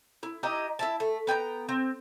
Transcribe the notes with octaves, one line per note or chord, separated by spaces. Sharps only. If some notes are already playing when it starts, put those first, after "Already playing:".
E4
D#4 E4 G4 D#5
E4 E5 A5
A3
B3 G5 G#5 A#5
C4